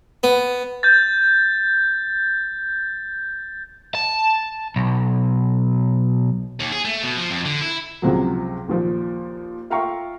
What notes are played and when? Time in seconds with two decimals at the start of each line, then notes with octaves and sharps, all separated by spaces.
0.23 B3
0.83 G6 A6
3.95 A5
4.76 B1
6.60 D#2
6.72 G#4
6.85 A3
7.04 B2
7.18 F3
7.31 F2
7.46 D3
7.62 E4
8.02 C#2 C3 F3 F#3
8.68 D#2 A#2 F3
9.70 F4 E5 F5 G5 A#5 C#6